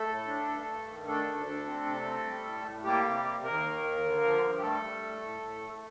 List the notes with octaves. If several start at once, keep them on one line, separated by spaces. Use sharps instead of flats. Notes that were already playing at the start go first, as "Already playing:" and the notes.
Already playing: A3 A4
A2
D4
G2
G2
D#3
A3 D4 A4
D2
D4
C4
C3
C4
G3
A2
A2
G3 A#3 G4
C3
A#3
D#2 A#3 A#4
D#3
D#2
D3
F3
G2
G4
G3 A3 A4
G3
A2
A2
A2
A3